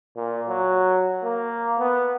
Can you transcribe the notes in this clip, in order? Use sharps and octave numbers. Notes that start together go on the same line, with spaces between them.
A#2
F#3
A#3
B3